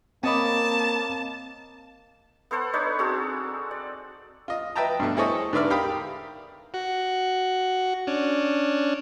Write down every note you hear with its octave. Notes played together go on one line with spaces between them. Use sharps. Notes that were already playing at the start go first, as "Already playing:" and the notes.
A#3 C4 C#5 D#5 A5 B5 D6
B3 A4 C5 F#5
D4 D#4 B4 C#5
C4 F#4 G#4 A4
D5
F4 D#5
B4 D#5 E5 G5 A5 A#5
G2 B2 A3
E4 G#4 A4 C5 C#5 D#5
G#2 D3 B4 D5 E5 F6
G4 A#4 F5 G5 B5 D#6
F#4
C#4 D4